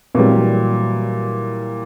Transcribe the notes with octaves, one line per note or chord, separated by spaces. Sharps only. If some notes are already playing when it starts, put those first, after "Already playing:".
A#2 E3 F#3 G3